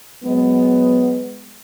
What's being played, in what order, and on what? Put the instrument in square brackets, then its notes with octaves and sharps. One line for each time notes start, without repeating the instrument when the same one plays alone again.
[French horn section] F#3 G#3 B3